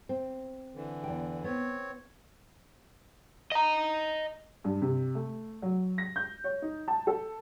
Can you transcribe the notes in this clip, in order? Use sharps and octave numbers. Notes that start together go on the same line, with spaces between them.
C4
D3 E3
E2 G5
B3 C4 C#5
D#5 A#5
G2
C3
A3
F#3
A#6
G6
C#5
D#4
A5
A4